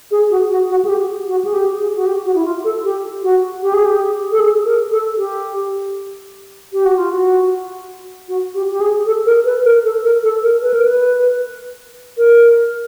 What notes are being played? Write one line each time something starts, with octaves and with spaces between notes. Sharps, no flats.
G#4
F#4
F#4
F#4
G#4
G4
F#4
G#4
G4
G#4
F#4
G4
F#4
E4
F4
A4
G4
F#4
G4
G#4
G4
A4
G#4
A#4
A4
G4
G4
F#4
F4
F#4
F#4
G4
G4
G#4
A4
A#4
B4
A#4
A4
A#4
A4
A#4
B4
A#4
B4
A#4